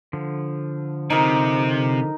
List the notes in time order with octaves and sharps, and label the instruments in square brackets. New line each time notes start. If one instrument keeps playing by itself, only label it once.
[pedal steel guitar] D3 F3
[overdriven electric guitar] C3 [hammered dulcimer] D#4 A#4